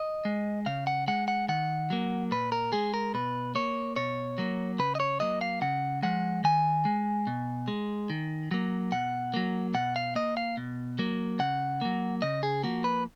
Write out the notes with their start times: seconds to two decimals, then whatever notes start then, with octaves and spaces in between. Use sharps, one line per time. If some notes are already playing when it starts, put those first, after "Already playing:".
Already playing: D#5
0.25 G#3
0.66 C#3 F5
0.87 F#5
1.08 G#3 F#5
1.28 F#5
1.48 D#3 F#5
1.90 F#3 A#3
2.31 A#2 B4
2.52 A#4
2.72 G#3 G#4
2.94 A#4
3.14 B2 B4
3.55 A#3 C#5
3.96 B2 C#5
4.38 F#3 A#3
4.79 C#3 B4
4.95 D#5
5.00 C#5
5.20 F#3 A#3 D#5
5.41 F5
5.61 C#3 F#5
6.03 F3 G#3 F#5
6.44 D#3 G#5
6.85 G#3
7.27 B2
7.68 G#3
8.10 D#3
8.51 F#3 A#3
8.92 B2 F#5
9.34 F#3 A#3
9.74 B2 F#5
9.96 F5
10.15 A#3 D#5
10.37 F5
10.57 B2
10.99 F#3 A#3
11.39 C#3 F#5
11.81 F#3 A#3
12.22 C#3 D#5
12.43 G#4
12.63 F3 A#3 F#4
12.84 B4